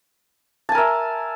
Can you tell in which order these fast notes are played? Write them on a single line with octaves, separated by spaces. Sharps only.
A5 G#5 A#4 E5